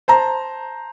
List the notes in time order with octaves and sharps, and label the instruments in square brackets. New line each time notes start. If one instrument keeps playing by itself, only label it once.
[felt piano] C5 A5 A#5